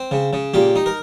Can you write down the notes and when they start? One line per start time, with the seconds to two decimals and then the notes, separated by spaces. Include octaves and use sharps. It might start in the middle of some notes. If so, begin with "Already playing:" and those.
Already playing: C4
0.11 C#3
0.33 C#3
0.54 A#2 G4
0.76 D#4
0.86 A#4